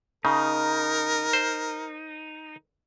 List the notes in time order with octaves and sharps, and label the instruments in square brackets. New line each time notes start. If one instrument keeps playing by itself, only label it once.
[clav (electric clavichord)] C#3 [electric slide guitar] D#4 [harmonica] A#4
[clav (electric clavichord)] C5